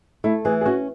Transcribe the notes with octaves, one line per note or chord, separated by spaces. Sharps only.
A3 E4
E3 G#4
G#4
C#4 F#4